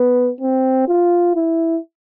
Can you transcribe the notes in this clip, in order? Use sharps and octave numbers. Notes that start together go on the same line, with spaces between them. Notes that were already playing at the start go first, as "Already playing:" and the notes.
Already playing: B3
C4
F4
E4